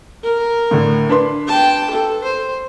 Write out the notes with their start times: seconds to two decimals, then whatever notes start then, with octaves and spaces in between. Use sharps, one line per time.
0.23 A#4
0.71 A2 D3
1.09 D4 B4 C6
1.47 G5 A5
1.90 A4
2.24 C5